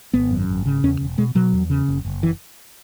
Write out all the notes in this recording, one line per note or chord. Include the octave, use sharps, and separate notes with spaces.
G#1 B3
F#2
G#1
C#3
E2 C#4
E1
B2 G#3
B2 F#3
E2
C#3
F#1
F#1
E3